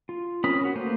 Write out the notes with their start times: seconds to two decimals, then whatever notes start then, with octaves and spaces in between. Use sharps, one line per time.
0.09 F4
0.44 C4 C#4 A#4 B5 D#6
0.61 C#4 F#4
0.75 A3 A#3 B4 C5